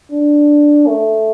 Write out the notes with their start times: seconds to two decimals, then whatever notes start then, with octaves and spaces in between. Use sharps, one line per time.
0.11 D4
0.87 A3